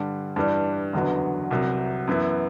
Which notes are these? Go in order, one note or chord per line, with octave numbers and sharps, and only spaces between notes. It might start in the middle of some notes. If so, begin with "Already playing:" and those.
Already playing: G2 D3 G3
G2 E3 G3 D4
F#1 E2 D3 F#3 B3
C2 C3 F#3
F#2 E3 B3 E4